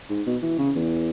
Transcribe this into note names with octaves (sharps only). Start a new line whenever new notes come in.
G#2
B2
E3
C#3
E2